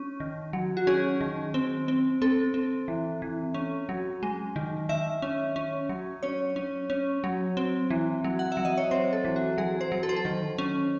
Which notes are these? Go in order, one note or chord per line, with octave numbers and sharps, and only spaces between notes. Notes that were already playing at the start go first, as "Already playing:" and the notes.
Already playing: C#4
D#3
F#3
F#4
C#4 G#4
D#3
C4
C4
C4 A4
C4
E3
E3
C#4
F#3
G#3
D#3
D#3 E5
C#4
C#4
F#3
C#4 C#5
C#4
C#4
F#3
C4
E3
F#3
F#5
E5
F#3
D#5
C#5
C4 C5
A4
E3
F#4
F#3 G#4
C5
F#3
A4
C5
A4
D#3
C#4